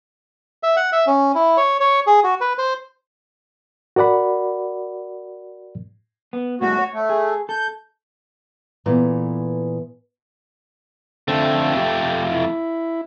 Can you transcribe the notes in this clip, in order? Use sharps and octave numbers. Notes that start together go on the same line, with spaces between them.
E5
F#5
E5
C#4
E4
C#5
C#5
G#4
F#4
B4
C5
F#4 A#4 D5 F#5 B5
B3
A2 G3 A3 F#4
C#5
A3
G#4
A4 G6
A#2 E3 B3 A4 A#5
F2 D3 A3 C4
G4
E4